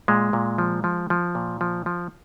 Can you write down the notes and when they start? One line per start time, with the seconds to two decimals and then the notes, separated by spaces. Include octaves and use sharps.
0.08 A#2 G#3
0.33 A#2
0.58 F3
0.84 F3
1.10 F3
1.35 A#2
1.61 F3
1.86 F3